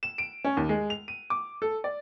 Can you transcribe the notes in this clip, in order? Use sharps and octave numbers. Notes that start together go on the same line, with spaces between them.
E7
D7
C#4
D#2
G#3
F7
D#7
D6
A4
D5